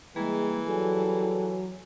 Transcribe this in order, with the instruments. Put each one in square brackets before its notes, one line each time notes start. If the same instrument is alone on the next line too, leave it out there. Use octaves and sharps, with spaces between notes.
[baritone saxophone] E3 [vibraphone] G3 A#3 G#4 [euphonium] G#3
[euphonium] F#3 [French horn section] G3 G#4 A4 [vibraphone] G#5